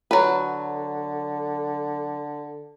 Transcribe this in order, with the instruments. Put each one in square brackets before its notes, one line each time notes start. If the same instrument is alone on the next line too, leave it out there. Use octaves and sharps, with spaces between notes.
[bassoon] D3 [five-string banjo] F#3 B4